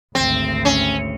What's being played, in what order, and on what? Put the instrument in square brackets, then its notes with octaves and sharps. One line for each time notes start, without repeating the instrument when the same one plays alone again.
[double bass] G#1 D2 [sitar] C4
[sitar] C#4